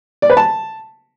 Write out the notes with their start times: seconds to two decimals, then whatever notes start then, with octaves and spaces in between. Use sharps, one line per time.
0.22 D5
0.30 B4
0.37 A5